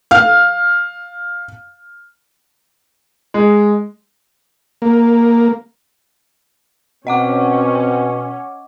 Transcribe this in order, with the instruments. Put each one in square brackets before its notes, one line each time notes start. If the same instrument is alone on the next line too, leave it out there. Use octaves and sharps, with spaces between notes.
[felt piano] F5 F6
[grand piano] G#3
[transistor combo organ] A#3
[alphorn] B2 [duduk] C4 [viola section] C#4 [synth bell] D#5 F#5 D6